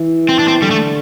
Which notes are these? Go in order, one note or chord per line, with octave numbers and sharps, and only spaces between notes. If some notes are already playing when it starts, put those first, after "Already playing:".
Already playing: E3
C4
D4
C4
D3 G3
A3